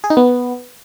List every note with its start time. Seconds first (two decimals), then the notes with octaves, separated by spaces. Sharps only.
0.04 G#4
0.10 D#4
0.17 B3